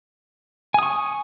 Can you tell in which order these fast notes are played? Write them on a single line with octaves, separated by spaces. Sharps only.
G#5 D#6 C#6